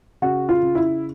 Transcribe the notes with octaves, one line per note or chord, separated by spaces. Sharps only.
C#3 F#4
F4
C#3
E4